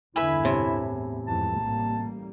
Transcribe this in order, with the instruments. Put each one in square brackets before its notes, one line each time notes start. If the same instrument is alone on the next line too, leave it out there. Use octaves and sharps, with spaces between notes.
[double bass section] E2 G2 D3 [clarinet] E4 [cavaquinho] B4 E5 G#5
[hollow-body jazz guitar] A2 C3
[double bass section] E2
[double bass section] F2 G#2 E3 [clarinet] A5
[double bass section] A1 G3 A#3